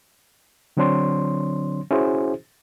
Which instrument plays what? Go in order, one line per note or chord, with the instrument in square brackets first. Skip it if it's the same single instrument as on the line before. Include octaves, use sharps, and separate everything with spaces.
[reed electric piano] D3 F#3 C4 D4 C#5 C6
C#4 E4 F#4 G#4 C5